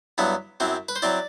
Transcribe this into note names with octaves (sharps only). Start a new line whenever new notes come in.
G2 F#3 B3 E4
F#2 F#3 C4 E4
B4
C5
F#3 C4 E4 D5